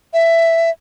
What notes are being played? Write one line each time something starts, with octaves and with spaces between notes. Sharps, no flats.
E5